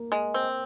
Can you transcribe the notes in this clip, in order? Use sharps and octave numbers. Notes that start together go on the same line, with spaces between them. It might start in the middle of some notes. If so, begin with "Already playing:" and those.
Already playing: A#3
G#3
C4